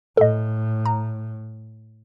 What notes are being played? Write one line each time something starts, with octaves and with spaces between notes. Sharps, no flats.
A2 A4 D#5
A#5